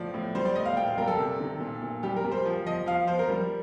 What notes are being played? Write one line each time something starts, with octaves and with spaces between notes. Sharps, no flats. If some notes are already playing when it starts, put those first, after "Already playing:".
Already playing: A2 F3 D5
A2
G3 C5
D5
A2 D#5
F5
A#2 G5
F5
G3 A#4
A4
C3
D#3
A#2
A#2
G3 G4
A#4
G3
C5
F3
F3 D#5
F3 F5
F3 C5
A#4
G3